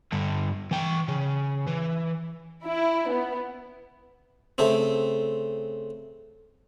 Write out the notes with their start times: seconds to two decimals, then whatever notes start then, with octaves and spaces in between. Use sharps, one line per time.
0.12 G2 D3
0.71 E3 G5
1.08 C#3
1.67 E3
2.66 E4
3.11 B3
4.58 C#3 A3 C4